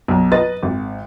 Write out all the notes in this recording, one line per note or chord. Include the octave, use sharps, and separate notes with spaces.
B1
B4 D#5 A6
G#1